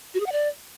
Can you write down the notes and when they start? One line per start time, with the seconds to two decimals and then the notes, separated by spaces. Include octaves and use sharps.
0.14 F#4
0.20 G#4
0.26 F#5
0.32 D5